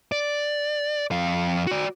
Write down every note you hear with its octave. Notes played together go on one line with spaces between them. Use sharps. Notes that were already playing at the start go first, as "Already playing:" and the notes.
D5
F2 F5
F#4 D5